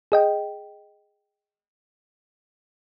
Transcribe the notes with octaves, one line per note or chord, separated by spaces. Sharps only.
G#4 D#5 G5